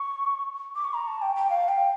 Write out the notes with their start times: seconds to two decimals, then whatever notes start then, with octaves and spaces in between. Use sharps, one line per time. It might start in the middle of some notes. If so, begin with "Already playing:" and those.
Already playing: C#6
0.75 D6
0.84 C#6
0.93 A#5
1.08 A5
1.22 G5
1.36 G5
1.50 F5
1.69 G5